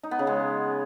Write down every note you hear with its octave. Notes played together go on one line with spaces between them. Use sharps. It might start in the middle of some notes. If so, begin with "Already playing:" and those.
D#4
B3
C#3
G#3